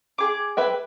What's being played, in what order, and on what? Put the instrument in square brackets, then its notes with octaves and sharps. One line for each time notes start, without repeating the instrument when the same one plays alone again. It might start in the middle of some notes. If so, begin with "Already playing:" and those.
[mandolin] G#4 D6
[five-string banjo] B4 E5 G5